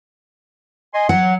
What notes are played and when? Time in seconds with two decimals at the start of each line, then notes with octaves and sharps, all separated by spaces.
0.94 D#5 G#5 C6
1.09 F#3 F#5